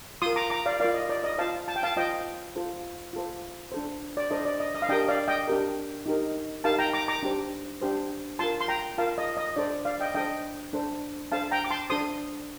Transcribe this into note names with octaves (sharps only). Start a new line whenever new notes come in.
F4 A#4 C6 D#6
A#5 D6
A#5 D6
D5 F5
F4 A#4 D5 F5
D#5
D5
D#5
F4 C5 F5 A5
A5
G5
F5 A5
F4 C5 D#5 G5
F4 A4 C5
F4 A4 C5
D4 A4 C5
D5
D4 A4 C5 D#5
D5
D#5
D#5
F5
D4 G4 A#4 D#5 G5
D5 F5
D#5 G5
D4 G4 A#4
D#4 G4 A#4
D#4 G4 A#4 F5 A5
G5 A#5
A#5 D6
A#5 D6
D4 G4 C5
D4 G4 C5
F4 A#4 A5 C6
C6
G5 A#5
F4 A#4 F5 A5
D#5
D#5
D4 A4 C5 D5
D5 F5
D#5 G5
D4 A4 C5 D#5 G5
D4 A4 C5
D4 A4 C5 F5 A5
G5 A#5
D6
A5 C6
D4 A4 C5 C6 D#6